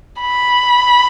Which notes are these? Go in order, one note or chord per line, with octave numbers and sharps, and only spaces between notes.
B5